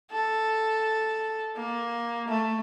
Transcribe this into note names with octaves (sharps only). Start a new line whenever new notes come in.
A4
A#3
A3